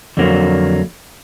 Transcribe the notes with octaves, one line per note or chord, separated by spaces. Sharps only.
F2 D3 F#3 A#3